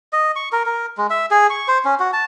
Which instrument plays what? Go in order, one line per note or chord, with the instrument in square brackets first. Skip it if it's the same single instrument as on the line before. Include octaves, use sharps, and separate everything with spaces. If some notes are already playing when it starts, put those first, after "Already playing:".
[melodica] D#5
C#6
A#4
A#4
G#3
E5
G#4
C#6
C5
C#4
F#4
A5